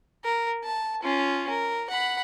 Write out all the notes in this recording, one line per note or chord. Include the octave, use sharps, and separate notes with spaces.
A#4
A5
C#4 F4
A#4
F#5 B5